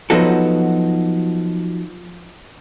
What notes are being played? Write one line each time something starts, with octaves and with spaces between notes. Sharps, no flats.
F3 F#3 B3 D#4 F#4 A4